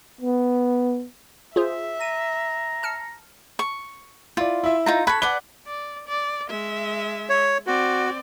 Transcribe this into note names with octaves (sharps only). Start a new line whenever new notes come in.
B3
F4 G#4 C5 E5
A#5 D#7
A5 F6 C#7
C#6
E4 F4 D5
E4 E5
D#4 F4 A#5
A4 B5 C#6 F#6 G#6
B4 D5 F#5 G7
D5
D5
G#3 E5
C#5
C4 F#4 D5